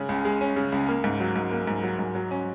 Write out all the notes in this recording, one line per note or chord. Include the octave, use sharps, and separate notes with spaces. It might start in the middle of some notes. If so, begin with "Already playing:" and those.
Already playing: C#3 G#3 C#4
C#2
G#3
C#4
C#3
C#2
A#3
G#2
F#3
G#2
A#3
G#2
F#3
G#2
F#3
C#4